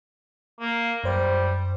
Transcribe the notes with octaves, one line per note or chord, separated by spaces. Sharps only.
A#3
F#2 G3 C5